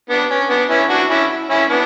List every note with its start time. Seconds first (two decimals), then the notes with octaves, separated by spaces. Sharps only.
0.10 B3 D4
0.31 C#4
0.50 B3 D4
0.70 C#4 E4
0.89 D4 F#4
1.10 C#4 E4
1.50 C#4 E4
1.69 B3 D4